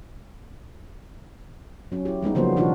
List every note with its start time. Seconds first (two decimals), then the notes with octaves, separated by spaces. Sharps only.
1.92 F#3 C#4
2.05 E4 G4
2.23 G3 G#3 B3 D#4
2.35 C#3 F3 F#3 A#3 B3 C5
2.56 B2 E3 D4 D#4 F4 F#4